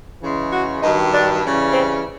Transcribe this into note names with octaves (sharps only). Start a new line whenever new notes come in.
C#3 E3 G#3
F#4
G2 D#3 F#3 D#4
D4
C#3 E3 G3
C4